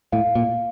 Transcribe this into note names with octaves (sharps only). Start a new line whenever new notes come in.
A2 F5
A#2